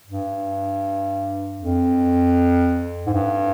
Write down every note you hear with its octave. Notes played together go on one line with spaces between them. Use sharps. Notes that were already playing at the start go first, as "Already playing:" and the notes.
G2
F2
G#2
G2